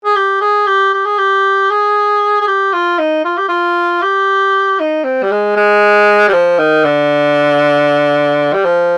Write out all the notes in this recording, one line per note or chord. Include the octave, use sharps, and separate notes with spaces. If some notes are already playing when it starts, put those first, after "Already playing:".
G#4
G4
G#4
G4
G4
G#4
G4
G#4
G#4
G4
F4
D#4
F4
G4
F4
G4
D#4
C4
G3
G#3
G#3
G3
F3
D#3
D3
G3
F3